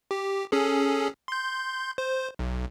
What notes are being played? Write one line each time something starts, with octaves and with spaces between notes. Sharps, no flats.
G4
C#4 G#4 A4
C6 G6
C5
B1